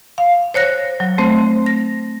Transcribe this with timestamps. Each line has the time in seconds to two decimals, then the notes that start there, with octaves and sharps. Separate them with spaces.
0.18 F5
0.54 C5 C#5 F#6 A#6
1.00 F#3
1.18 A3 C4 C5
1.66 A#6